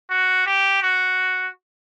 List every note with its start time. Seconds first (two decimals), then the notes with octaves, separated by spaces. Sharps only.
0.10 F#4
0.46 G4
0.83 F#4